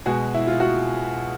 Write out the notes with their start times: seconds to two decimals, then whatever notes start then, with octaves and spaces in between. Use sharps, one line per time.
0.06 B2 G#3 F#4 G#4
0.34 E4
0.47 F4
0.60 F#4